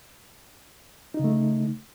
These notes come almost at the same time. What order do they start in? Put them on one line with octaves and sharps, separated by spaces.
D#4 C#3 A3